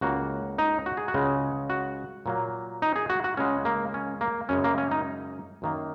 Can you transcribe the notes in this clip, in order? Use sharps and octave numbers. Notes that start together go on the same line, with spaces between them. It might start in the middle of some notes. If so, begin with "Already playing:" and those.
C#2 C#3 A#3 F#4
D#4
F#4
G#4
F#4
C#2 C#3 G#3
F#4
A#2 F#3 A#3
D#4
G#4
F#4
F#4
C#2 C#3 G#3 C#4
A#3
C#4
A#3
F#2 C#3 G#3 C#4
A#3
C#4
D#4
F#2 D#3 A#3